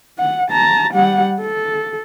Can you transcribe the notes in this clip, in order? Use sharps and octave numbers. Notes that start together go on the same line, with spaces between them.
F#5
A5 A#5
G3 F#5
A4